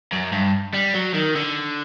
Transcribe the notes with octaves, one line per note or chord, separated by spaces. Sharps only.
F#2
G2
G3
F#3
D#3
D3